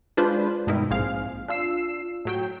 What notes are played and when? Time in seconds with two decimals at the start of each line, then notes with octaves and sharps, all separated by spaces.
0.17 G#3 D4 F4 B4 C5
0.67 G2 B2 D#3 G#3 D#4 E4
0.90 A#1 G#2 C4 G#4 F5
1.48 D4 F4 E6 C7
2.25 A2 F#3 G5